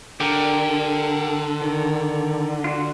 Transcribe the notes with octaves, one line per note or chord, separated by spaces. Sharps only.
D3 G4 A#4
D#3
F4 F#4